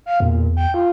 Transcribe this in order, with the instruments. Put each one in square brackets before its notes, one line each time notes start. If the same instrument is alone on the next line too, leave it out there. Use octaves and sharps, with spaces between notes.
[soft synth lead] F5
[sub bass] E2 [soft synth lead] A#2
[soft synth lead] G5
F4